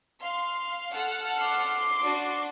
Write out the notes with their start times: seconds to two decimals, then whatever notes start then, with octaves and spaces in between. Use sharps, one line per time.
0.21 F5 C6
0.92 A4 F#5 F6
1.40 C6 D6
2.02 D4 F#4